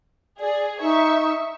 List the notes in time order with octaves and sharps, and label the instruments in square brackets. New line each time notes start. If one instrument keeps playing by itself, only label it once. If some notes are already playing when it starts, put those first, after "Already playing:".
[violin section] G#4 [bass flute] D5
[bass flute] D#4 [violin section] E5 C#6